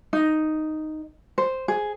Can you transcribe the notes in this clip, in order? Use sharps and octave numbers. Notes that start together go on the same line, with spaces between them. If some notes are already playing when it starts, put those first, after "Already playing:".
D#4
C5
G#4